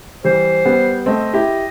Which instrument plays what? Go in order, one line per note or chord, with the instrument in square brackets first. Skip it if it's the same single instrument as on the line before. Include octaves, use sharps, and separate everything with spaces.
[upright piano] E3 G3 [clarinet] C5
[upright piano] G3 B3
[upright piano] A3 C4 [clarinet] D#5
[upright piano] E4 G4